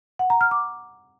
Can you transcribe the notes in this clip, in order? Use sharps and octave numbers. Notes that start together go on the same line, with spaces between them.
F#5
A#5
F6
D6